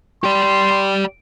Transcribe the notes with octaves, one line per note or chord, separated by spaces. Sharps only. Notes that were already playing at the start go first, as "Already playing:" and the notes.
G4 D5 C6